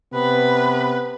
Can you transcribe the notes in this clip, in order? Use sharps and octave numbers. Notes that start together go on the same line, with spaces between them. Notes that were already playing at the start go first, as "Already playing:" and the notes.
C3 B3 B4